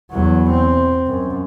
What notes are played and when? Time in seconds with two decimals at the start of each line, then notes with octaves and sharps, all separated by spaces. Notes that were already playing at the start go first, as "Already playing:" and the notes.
0.11 E2 F#3
0.50 C4
1.07 F#2